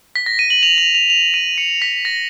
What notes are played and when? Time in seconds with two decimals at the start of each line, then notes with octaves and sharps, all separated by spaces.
0.16 B6
0.26 A#6
0.39 D#7
0.50 F#7
0.63 F7
0.78 F7
0.95 F7
1.10 F7
1.34 D#7
1.58 C#7
1.82 B6
2.05 A#6